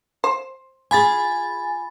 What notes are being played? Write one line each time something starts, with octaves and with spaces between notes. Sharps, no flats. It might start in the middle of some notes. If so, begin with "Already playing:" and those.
C5
F4 G#4 G#5 B5 A6